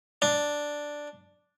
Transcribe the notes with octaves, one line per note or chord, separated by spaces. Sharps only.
D4